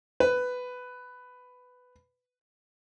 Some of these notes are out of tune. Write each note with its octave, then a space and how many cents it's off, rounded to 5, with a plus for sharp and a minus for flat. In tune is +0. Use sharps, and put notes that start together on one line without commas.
B4 +10